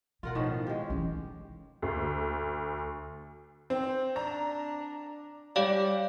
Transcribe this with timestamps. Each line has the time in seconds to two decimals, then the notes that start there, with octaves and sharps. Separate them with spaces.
0.23 B2 F4 A#4 F#5
0.35 A2 D#3 F3
0.67 G#3 G4
0.90 E3 C#4
1.82 D2
3.70 C4
4.16 D4 A#5
5.56 G3 G4 C#5 D5 F5